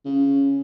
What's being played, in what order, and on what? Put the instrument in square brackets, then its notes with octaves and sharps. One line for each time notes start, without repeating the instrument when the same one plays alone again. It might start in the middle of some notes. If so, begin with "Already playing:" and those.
[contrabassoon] C#3